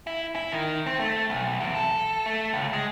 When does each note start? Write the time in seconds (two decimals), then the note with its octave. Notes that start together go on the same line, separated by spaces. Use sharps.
0.07 E4
0.35 E4
0.52 D#3
0.86 C4
0.99 A3
1.30 B1
1.60 E2
1.75 A4
2.26 A3
2.53 C#2
2.73 G#3